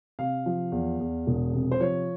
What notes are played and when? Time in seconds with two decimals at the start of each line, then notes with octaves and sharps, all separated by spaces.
0.19 C3 F5
0.46 F3
0.72 E2
1.00 E2
1.27 E1
1.53 C3
1.72 C5
1.80 F3 C#5